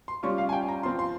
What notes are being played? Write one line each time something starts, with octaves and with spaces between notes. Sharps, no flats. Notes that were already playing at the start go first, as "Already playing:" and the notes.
C6
G3 C#4 F4 C#6
F5
G#5
G5
A#5
F3 C4 F4 C6
C6